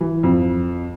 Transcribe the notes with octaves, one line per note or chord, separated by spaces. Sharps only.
E3
F2